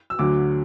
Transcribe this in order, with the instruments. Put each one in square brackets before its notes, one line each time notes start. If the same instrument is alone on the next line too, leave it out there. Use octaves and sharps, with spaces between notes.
[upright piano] E6
D2 D3 F#3 D6